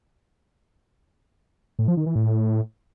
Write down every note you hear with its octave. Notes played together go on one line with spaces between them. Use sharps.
A2
F3
D#3
E3
A2